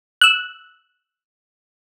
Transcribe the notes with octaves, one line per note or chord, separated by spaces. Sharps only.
E6 F#6